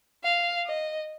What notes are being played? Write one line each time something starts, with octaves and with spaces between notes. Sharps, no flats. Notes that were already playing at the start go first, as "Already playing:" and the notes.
F5
D#5